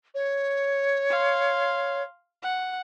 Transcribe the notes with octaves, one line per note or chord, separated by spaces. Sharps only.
C#5
F5 C6
F#5